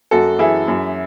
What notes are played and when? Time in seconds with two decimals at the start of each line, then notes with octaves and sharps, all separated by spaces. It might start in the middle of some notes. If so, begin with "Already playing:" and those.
0.11 F#2 F#4 A4
0.39 E3 E4 G#4
0.68 F#2